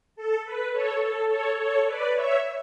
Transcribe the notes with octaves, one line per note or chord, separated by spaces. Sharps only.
A4
B4
A4 C#5
A4
A4 C#5
A4 C#5
B4 D5
C#5 E5